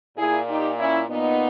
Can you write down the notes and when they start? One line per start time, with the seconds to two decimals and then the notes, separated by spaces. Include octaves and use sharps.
0.17 A#2 E4 G#4
0.48 D#4 G4
0.78 C#4 E4
1.09 A#2 B3 D#4